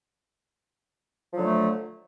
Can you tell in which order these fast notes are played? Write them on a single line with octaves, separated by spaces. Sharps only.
F3 F#3 D3 A3